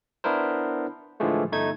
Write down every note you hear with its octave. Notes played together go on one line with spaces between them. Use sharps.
B3 D4 E4 A#4 C5
A2 D3 E3 F3 G#3 A3
G1 A3 D#4 G#6